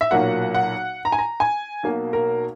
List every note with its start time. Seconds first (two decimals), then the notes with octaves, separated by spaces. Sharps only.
0.01 E5
0.11 B1 A#2 F#3 A#3 F#5
0.54 F#5
1.05 A#5
1.12 G#5
1.18 A#5
1.40 G#5
1.83 B1 B2 A#3
2.13 A#4